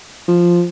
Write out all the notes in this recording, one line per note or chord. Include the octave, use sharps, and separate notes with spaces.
F3